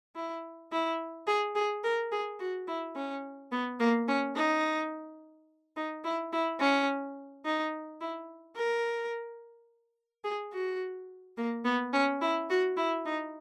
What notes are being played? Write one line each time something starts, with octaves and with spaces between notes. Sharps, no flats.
E4
E4
G#4
G#4
A#4
G#4
F#4
E4
C#4
B3
A#3
C#4
D#4
D#4
E4
E4
C#4
D#4
E4
A#4
G#4
F#4
A#3
B3
C#4
E4
F#4
E4
D#4